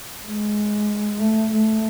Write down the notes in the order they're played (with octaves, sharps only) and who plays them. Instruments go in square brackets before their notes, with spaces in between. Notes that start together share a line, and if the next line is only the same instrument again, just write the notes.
[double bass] G#3
A3
A3